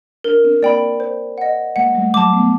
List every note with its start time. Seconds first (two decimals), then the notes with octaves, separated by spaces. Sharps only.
0.24 D4 A#4
0.44 C4 D4
0.62 A#3 C4 D5 G5 B5
1.00 C5
1.38 D#5 F#5
1.76 G#3 A#3 F#5
1.95 G3 A3
2.14 F#3 G#3 A5 D6
2.33 A3 B3